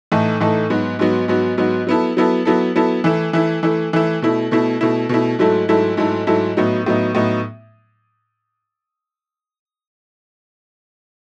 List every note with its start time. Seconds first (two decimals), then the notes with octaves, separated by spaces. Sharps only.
0.12 A2 E3 A3 D#4 A4
0.40 A2 E3 A3 D#4 A4
0.70 G#2 F#3 B3 F#4
0.99 G#2 F#3 B3 F#4
1.28 G#2 F#3 B3 F#4
1.58 G#2 F#3 B3 F#4
1.87 F#3 B3 E4 A4
2.17 F#3 B3 E4 A4
2.45 F#3 B3 E4 A4
2.75 F#3 B3 E4 A4
3.04 E3 A3 E4
3.33 E3 A3 E4
3.63 E3 A3 E4
3.93 E3 A3 E4
4.22 B2 A3 E4
4.51 B2 A3 E4
4.81 B2 A3 E4
5.09 B2 A3 E4
5.39 G#2 F#3 A3 E4 A4
5.68 G#2 F#3 A3 E4 A4
5.97 G#2 F#3 A3 E4 A4
6.27 G#2 F#3 A3 E4 A4
6.57 A2 F#3 B3 D#4
6.86 A2 F#3 B3 D#4
7.15 A2 F#3 B3 D#4